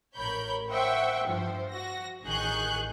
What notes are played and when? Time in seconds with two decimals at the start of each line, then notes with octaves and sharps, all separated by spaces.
0.16 A1 A#4 C#5 B5 G6
0.70 C5 E5 F#5 G5 C#6
1.26 G2 F3 C5
1.70 F#4 A#6
2.24 A1 D#3 G#4 C#6 F#6 G6